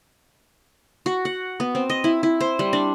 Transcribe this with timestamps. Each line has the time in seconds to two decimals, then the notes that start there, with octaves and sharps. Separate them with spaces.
1.06 F#4
1.25 F#5
1.60 B3
1.75 C4
1.90 D#5
2.04 E4
2.23 E4
2.40 C5
2.59 G3
2.73 D4